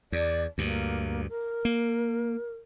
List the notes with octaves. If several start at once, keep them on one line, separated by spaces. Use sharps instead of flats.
E2 D5
D2 G2 A#3
A#4
A#3